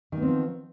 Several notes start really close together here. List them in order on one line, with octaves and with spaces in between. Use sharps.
D#3 B3 C4 F3